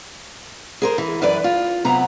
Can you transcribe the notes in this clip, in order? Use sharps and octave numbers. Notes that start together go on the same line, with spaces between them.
G#4 A#4 C5
E3
F#2 E3 B4 D5
F4
C3 F#3 B3 A#5